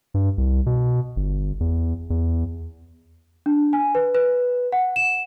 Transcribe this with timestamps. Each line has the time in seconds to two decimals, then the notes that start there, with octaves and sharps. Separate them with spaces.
0.14 G2
0.38 C2
0.66 B2
1.16 G1
1.60 E2
2.10 E2
3.46 D4
3.73 G#5
3.95 B4
4.15 B4
4.72 F#5
4.96 E7